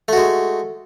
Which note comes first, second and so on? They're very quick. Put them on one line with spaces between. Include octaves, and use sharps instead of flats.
A3 F#4 G#3